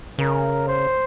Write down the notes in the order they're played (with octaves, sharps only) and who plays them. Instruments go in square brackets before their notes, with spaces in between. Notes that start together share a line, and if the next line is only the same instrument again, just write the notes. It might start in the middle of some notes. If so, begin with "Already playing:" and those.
[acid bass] C#3 [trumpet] A#4
[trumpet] C5